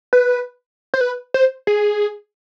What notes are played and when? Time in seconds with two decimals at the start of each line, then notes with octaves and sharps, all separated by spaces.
0.13 B4
0.94 C5
1.01 B4
1.34 C5
1.67 G#4